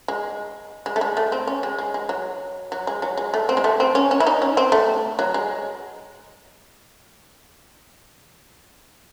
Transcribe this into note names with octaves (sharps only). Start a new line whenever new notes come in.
G#3
G#3
A3
G#3
A3
C4
C#4
G#3
G#3
G#3
F#3
F#3
G#3
F#3
G#3
A3
C4
G#3
A3
C4
C#4
C#4
E4
D#4
C#4
C4
A3
F#3
G#3